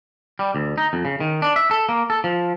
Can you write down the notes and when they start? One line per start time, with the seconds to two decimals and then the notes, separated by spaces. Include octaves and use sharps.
0.39 G3
0.55 D2
0.78 D#4
0.93 F2
1.05 C#3
1.20 D#3
1.42 D4
1.56 E5
1.71 A4
1.89 A#3
2.10 A4
2.24 F3